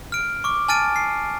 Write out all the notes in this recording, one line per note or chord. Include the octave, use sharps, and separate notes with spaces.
F6 D7
C#6 D6
G#5 A5 F6 A6 D7 D#7
C7